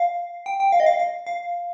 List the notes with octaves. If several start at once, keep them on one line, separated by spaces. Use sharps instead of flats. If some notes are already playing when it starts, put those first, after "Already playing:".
Already playing: F5
G5
G5
F5
D#5
F5
F5
F5